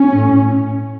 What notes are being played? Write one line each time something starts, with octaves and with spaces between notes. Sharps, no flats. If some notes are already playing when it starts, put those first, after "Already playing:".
Already playing: C#4
A2